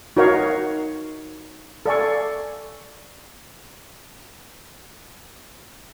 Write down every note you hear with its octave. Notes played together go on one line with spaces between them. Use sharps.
D#4 F#4 A#4 C#5 F5
A4 D5 F5 G#5 C#6